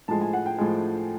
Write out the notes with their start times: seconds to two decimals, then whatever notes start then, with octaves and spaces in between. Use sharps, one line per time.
0.08 A2 F3 G#3 A5
0.21 G#5
0.33 F#5
0.46 G5
0.58 A2 F3 G#3